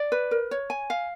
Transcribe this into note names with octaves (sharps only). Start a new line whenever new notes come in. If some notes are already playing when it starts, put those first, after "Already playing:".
Already playing: D5
B4
A#4
C#5
G#5
F5